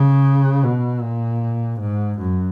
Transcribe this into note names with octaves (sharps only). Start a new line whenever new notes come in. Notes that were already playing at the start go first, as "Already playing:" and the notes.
Already playing: C#3
B2
A#2
G#2
F#2